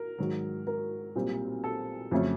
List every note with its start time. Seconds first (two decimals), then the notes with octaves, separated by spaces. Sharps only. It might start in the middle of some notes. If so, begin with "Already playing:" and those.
Already playing: A#4
0.18 G#2 D#3 F#3
0.67 A#4
1.15 B1 A#2 G3 C4
1.64 A4
2.11 F2 C#3 F#3 A3 C#4